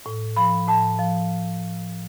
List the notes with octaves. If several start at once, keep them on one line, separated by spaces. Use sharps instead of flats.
A2
F3 B5
A2 A5
F3